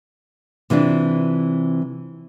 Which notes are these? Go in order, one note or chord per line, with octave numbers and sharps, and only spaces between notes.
C3 E3 D4 F4